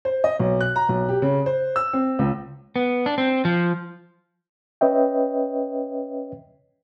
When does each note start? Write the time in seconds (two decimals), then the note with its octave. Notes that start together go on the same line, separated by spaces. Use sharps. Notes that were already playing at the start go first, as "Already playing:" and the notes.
0.05 C5
0.24 D#5
0.39 B1
0.61 F#6
0.76 A#5
0.89 B1
1.09 G4
1.22 C#3
1.46 C5
1.76 E6
1.93 C4
2.19 C#2
2.76 B3
3.06 D4
3.18 C4
3.45 F3
4.81 C#4 B4 C#5 D#5 E5 G5